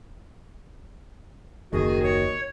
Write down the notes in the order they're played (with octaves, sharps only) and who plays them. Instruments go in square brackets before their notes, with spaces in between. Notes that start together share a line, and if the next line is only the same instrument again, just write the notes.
[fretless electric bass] F#1 D#2 [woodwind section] D#3 F#4 [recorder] G#4
[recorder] C#5